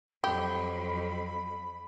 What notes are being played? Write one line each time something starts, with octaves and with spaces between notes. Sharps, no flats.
F2 F#3 G4 B5